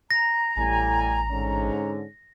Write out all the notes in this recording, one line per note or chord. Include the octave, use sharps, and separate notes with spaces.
A#5 A#6
A1 A2 G3 G#5
G#2 D3 C#4